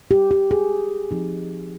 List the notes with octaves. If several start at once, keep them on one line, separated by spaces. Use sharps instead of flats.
G4
G4
G#4
F3 C4 D#4